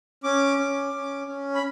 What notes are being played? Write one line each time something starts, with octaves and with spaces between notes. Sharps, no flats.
C#4 D6
C#4
C#4
C#4
B5